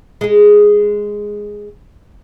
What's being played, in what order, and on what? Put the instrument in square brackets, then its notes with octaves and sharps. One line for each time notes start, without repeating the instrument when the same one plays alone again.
[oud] G#3 G#4